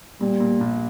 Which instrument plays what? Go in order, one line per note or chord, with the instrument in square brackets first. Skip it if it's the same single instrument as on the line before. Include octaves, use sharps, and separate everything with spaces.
[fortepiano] A#2 [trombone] G3
[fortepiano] A#2
A#1